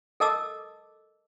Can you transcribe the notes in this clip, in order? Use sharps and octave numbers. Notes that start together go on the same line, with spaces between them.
A4 A#4 D#5 A5 D6 E6